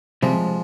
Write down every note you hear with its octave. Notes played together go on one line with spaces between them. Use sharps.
C3 F3 G3 G#3 C4